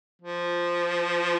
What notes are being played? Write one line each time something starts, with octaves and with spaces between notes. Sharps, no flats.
F3